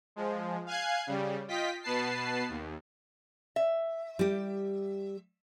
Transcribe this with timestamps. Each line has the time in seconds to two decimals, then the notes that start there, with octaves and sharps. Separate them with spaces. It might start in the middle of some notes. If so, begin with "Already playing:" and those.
0.16 F3 G#3
0.66 F5 G#5 F#6 G#6 C7
1.07 C#3 G3
1.48 F4 D#5 G5 B6
1.82 B2 B3 B4 A5 C7
2.49 D#2
3.56 E5
4.19 G3 G4